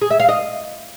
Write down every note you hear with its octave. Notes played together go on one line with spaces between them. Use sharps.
G#4
E5
F5
D#5